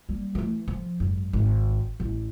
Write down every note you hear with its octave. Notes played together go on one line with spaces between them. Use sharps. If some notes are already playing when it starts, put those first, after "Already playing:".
G3 A#3
E3 A3
F3
G#1 F#2
G#1
A1